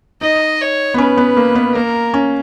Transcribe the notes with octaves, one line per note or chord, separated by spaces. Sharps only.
D#4 D#5
C#5
B3
C#4 B4
B3
A#3
B3
A#3 A#4
C#4